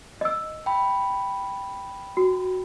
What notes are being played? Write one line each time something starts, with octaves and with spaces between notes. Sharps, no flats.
D#5 E6
G5 B5
F#4